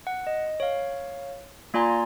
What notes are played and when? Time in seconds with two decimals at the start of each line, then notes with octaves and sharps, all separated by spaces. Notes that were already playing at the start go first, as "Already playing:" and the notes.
0.07 F#5
0.27 D#5
0.60 C#5 F5
1.74 A#3 F4 D5 G#5 A#5 C6